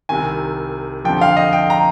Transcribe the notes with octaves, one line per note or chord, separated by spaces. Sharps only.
C2 C3 D#3 G#5
F2 D3 F3 G5
F5
D#5
G5
A#5